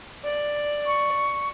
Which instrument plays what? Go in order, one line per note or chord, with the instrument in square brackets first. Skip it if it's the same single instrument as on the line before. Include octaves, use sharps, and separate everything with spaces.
[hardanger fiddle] D5
[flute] C#6